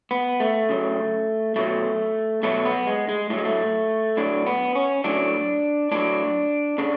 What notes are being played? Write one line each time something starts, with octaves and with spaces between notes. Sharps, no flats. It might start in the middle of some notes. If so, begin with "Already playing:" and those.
B3
A3
C#3 F#3
B2 F#3 A3
B2 F#3 A3
B3
G#3
G#3
A2 F#3 G#3 A3
A3
A2 F#3 D4
B3
C#4
A2 F#3 D4
A2 F#3 D4
C#3 D4